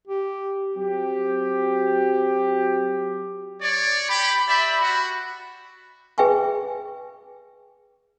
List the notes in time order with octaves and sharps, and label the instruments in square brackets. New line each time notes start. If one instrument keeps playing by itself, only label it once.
[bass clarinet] G4
[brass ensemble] F#3 C4 F#4 G4
[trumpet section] C#5 D5
[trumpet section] G4 [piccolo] B5
[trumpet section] G4 D5 E5
F#4
[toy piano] G#4 B4 E5 G5 G#5 C#6